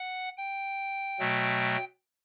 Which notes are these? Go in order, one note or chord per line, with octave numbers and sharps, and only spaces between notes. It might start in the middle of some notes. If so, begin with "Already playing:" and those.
Already playing: F#5
G5
B2 F#3 A3